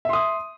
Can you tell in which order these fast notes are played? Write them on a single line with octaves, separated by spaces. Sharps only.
E5 C6 D#6